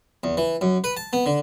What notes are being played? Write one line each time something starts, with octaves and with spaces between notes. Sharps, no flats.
E2
E3
F#2
B4
A5
B3
D3